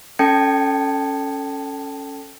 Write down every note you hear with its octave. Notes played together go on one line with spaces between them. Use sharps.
C#4 A4 G5 A5 G#6 C#7